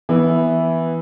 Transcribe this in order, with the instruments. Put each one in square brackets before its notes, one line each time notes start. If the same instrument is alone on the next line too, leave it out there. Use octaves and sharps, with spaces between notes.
[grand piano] E3 B3 E4